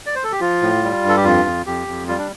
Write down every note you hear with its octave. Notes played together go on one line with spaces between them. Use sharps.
D5
C5
A4
G4
F3 F4
A2
G3
G2
A4
G4
F2 F4
F2
F2 G4
F2
G3 F4
D4